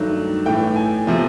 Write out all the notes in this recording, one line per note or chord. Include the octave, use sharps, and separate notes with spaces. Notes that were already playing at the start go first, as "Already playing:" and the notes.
Already playing: G2 D#3 F#3 A3
A2 E3 A3 G5
G#5
C3 F3 A3